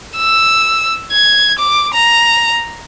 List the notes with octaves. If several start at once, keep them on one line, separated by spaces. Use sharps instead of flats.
E6
G#6
D6
A#5